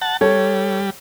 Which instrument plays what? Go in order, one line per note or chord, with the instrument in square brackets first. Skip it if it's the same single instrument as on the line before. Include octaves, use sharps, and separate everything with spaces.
[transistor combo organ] F#5 A5
[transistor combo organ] G3 [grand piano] A4 C#5